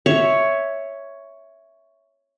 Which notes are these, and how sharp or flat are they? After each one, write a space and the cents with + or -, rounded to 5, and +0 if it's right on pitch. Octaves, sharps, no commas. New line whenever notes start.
C#5 +5 E5 +0